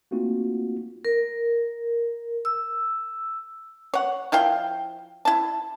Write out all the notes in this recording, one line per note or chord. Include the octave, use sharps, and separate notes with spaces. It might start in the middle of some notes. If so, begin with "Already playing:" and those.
A3 A#3 C4 D#4 F4 F#4
A#4
E6
C#5 F#5
F3 E4 F5 G5
E4 A5